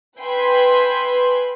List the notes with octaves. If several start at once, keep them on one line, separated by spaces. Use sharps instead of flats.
B4 E5 G5 G#5 B5 C6